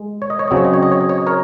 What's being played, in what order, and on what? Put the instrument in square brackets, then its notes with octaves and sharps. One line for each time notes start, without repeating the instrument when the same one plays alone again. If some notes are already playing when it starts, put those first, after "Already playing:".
Already playing: [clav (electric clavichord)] G#3
C#5
D#5
C#5
C#3 F#3 C4 D#5
C#5
D#5
C#5
D#5
C#5
D#5
C#5
D#5
A#4 C#5